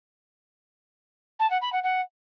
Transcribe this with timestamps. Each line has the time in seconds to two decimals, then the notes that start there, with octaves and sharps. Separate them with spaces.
1.40 A5
1.51 F#5
1.62 B5
1.73 F#5
1.84 F#5